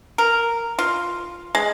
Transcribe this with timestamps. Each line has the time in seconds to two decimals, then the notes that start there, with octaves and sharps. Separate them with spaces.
0.18 A#4
0.79 F4
1.55 G#3